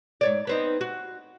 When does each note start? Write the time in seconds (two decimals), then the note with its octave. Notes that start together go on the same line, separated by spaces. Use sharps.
0.21 G#2 C#5 D5
0.47 B3 C4 D#4
0.81 F#4